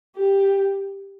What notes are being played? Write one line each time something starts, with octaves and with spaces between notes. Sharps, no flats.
G4